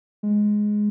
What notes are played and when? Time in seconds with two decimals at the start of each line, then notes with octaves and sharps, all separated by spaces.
0.23 G#3